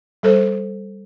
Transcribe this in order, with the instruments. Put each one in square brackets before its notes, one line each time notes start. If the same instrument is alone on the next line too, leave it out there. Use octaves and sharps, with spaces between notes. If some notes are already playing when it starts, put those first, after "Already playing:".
[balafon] G3 A4 C5